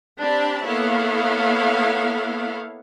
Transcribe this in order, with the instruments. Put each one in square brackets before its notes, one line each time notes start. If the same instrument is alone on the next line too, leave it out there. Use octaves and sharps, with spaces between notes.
[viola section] C4 D4 G4 A5 B5
A#3 B3 E4 A4 C#5 F5